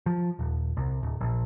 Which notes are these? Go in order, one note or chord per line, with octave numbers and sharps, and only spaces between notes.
F3
D#1
C2
D1
A#1